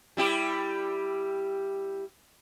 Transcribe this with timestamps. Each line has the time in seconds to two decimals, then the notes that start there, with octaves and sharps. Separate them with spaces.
0.17 G3 E4 G4